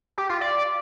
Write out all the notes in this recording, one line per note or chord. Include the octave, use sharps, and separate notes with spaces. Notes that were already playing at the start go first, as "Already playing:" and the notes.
G4
F4
D5